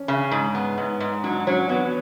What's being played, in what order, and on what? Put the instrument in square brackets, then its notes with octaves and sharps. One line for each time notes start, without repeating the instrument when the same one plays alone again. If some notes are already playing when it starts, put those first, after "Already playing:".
Already playing: [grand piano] C#4 D4
[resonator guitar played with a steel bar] C#3
G#2
B3
G#2
G#2
[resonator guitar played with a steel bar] F#3 [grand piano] D4
[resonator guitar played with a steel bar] F#3 [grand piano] C#4
[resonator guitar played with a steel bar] F#3 [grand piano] B3